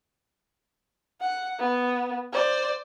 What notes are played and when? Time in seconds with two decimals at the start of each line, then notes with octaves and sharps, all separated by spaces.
1.21 F#5
1.59 B3
2.32 C5 D5